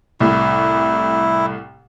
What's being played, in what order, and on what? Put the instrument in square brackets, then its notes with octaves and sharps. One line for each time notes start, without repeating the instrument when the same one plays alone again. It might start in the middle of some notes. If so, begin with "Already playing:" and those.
[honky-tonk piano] C2 A2 [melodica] E4